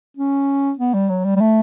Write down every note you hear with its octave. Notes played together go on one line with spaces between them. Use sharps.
C#4
B3
G3
F#3
G3
G3
A3